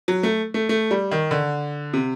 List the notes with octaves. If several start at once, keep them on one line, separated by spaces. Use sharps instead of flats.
F#3
A3
A3
A3
G3
D#3
D3
C3